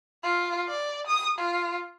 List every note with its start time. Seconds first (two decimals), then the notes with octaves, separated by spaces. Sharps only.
0.24 F4
0.68 D5
1.07 D#6
1.38 F4